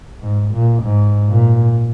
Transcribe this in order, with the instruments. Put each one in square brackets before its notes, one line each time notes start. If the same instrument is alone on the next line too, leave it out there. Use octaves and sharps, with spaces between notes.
[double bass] G#2
A#2
G#2
A#2